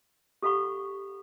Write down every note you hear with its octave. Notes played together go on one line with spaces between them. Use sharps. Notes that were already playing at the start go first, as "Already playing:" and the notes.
G4 A4 F5 F#5 B5 C#6